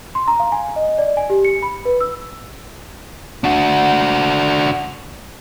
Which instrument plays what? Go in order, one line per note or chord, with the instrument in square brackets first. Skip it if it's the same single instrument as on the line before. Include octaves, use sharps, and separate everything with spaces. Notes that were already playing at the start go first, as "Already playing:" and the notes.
[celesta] C6
A#5
F5
G#5
D#5
D5
G#5
G4
C#7
B5
B4
E6
[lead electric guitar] D4 F#4